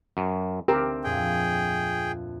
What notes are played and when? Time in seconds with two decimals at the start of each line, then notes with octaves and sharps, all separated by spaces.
0.17 F#2
0.68 D2 C4 G4 A#4
1.04 F2 A#2 G#4 G5